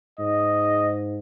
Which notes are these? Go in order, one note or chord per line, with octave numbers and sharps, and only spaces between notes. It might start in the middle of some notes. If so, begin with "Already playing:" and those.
G#2 D#5